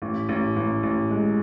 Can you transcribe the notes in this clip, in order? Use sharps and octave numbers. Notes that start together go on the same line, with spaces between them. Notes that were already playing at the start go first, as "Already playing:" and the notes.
A1
A1
A1
A1
G#3